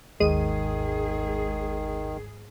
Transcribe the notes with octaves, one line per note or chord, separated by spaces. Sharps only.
G#1 D#2 G#2 D#3 G#3 G#4 D#7